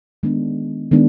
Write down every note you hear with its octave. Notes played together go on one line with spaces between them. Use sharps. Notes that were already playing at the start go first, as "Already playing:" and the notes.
D#3 G#3 B3 D4
D#3 G#3 B3 D4